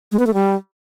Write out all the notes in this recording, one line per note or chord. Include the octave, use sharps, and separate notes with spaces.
G#3
B3
A3
G3